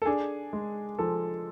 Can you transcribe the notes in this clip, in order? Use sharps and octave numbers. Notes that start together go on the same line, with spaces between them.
A4
D4 G#4
G#3
F3 A4